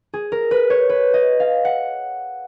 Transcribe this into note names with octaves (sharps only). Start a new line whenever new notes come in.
G#4
A#4
B4
C#5
B4
D#5
F5
F#5